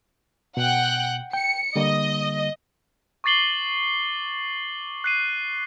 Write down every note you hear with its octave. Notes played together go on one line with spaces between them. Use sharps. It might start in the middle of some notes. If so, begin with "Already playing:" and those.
B2 F#5 G5 F#6
G5 C#7
D3 G3 A#3 D#5
C#6 D6 A6 C7 F#7 G7
F#6 C7 D#7